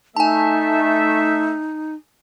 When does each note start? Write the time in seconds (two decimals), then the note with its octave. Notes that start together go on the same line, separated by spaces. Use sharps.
0.16 A3 D#4 E5 G#5 A5